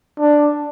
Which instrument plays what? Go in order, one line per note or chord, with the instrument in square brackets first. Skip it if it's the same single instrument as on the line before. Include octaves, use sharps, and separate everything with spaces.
[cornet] D4